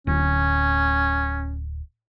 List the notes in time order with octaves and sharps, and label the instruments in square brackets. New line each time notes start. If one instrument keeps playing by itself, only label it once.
[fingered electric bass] D1 [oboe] C#4